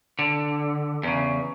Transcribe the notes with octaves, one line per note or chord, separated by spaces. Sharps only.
D3
E2 C#3